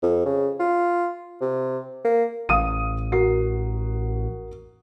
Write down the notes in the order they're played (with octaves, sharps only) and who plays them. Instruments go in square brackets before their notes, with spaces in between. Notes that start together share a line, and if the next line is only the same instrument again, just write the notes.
[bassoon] F2
C#3
F4
C3
A#3
[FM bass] A1 [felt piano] F5 D#6 D#7
[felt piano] F#4 A#4 C7